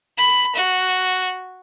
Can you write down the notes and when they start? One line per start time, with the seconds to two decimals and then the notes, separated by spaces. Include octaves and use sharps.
0.17 B5
0.55 F#4